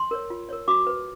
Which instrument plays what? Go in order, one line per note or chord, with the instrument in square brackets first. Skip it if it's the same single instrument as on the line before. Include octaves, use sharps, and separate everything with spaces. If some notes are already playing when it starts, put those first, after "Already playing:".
Already playing: [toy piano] C6
A#4 C#5
F4
A#4 C#5
F#4 D6
B4